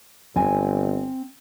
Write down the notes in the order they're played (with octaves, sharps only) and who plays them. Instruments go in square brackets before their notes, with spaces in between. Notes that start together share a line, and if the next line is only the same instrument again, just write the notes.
[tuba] G1 [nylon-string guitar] C4 G#5